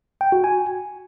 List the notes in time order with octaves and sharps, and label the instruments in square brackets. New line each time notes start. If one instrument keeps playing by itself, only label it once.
[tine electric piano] G5
F#4
G#5